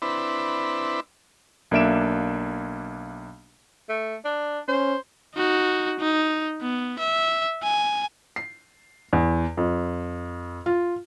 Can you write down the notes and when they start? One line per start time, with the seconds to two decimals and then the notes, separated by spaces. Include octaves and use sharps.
0.02 C4 D4 E4 B4
1.71 B1 A#3 D4 E5 D7 E7
3.89 A3
4.25 D4
4.68 C#4 C5
5.35 D#4 F#4
5.99 D#4
6.62 B3
6.99 E5
7.63 G#5
8.36 C7
9.13 E2
9.57 F2
10.66 F4